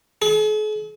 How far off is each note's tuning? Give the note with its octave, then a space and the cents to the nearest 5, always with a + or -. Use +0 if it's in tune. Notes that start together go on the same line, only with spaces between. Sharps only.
G#4 +45